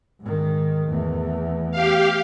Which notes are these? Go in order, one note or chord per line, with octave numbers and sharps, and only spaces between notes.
G#2 D#3
E2 A3
G4 F5